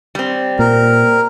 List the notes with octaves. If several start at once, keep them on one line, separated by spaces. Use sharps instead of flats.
G3 C4
A#2 A#4